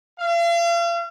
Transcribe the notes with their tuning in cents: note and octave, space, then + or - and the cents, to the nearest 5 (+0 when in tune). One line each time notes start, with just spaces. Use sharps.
F5 -40